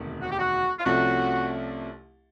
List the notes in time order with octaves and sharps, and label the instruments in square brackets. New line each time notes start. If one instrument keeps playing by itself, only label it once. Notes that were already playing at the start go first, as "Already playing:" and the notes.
Already playing: [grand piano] E1 D2 C3 D#3
[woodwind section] F#4
G4
F#4
F4
[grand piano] C2 C3 F3 A3 C#4 [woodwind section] F#4